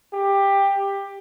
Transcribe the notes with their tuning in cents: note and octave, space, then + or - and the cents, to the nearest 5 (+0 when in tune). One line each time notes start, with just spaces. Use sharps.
G4 +15